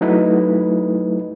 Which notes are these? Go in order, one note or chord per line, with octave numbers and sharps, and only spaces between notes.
F#3 A3 D#4 E4 B4 D#5